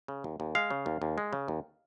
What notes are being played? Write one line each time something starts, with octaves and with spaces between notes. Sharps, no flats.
C#3
D#2
D#2
G#3 F5
C#3
D#2
D#2
G#3
C#3
D#2